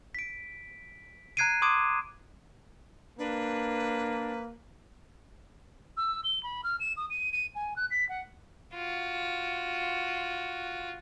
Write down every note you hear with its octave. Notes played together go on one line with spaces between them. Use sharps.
B6 D7
A#5 F#6 G#6 C7 D7 D#7
C6 D6 D#6 G#6 D7 E7
A#3 D4 B4
E6
G7
B5
F6
E7
D#6
D#7
D#7
G#5
F#6
B6
F#5
F4 F#4